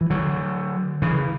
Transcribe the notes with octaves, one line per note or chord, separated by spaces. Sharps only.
E3
D3 F#3
C#3 E3